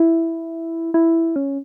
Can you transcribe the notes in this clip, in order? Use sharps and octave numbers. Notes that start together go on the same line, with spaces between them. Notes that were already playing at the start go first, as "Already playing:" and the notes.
Already playing: E4
E4
C#4